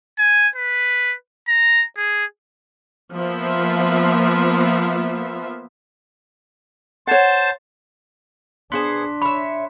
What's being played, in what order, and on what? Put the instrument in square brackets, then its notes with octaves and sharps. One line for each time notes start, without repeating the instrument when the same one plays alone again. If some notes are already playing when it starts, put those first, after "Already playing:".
[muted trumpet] G#5
B4
A#5
G#4
[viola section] F3 A#3 B3 F4 E5
[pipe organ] C5 A5 [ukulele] C#5 F#5
[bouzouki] B3 G#4 C5 [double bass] D4 [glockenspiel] C6 F#6 B6
[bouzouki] C#5 E5 [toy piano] B5